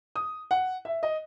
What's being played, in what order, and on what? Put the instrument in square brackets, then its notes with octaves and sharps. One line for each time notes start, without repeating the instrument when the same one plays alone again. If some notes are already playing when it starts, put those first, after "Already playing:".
[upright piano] D#6
F#5
E5
D#5